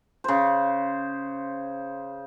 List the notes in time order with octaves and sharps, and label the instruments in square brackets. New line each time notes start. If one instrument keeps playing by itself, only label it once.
[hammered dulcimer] C#3 C5